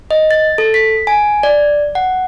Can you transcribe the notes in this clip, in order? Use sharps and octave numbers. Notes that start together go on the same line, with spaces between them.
D#5
A6
A4
B6
G#5
D5
F#5